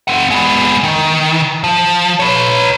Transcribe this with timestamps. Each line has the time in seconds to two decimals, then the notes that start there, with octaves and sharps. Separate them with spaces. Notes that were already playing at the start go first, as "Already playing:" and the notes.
0.08 C4 F#5
0.31 G#3 B3
0.83 D#3
1.64 F3
2.20 B4 C#5